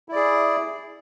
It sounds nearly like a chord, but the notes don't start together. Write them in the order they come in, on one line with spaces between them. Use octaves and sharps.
E4 D5 G#4